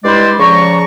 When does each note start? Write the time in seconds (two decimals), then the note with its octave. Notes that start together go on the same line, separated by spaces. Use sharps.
0.05 G2 G#3 E4 C5 D5 C6
0.39 C#3 F3 D5 A#5 C#6